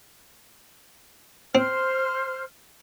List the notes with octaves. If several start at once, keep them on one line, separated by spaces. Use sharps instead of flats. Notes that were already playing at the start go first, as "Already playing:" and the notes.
C4 C5 F6